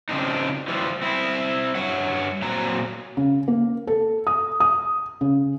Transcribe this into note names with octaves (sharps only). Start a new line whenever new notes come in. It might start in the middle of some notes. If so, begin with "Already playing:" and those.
C#3 F3 C4 D4 D#4
E3 F3 G3
C4 E4
G2 C#5 F#5
A#2 F#3 C4 A#5
C#3
A#3
A4
D#6
D#6
C#3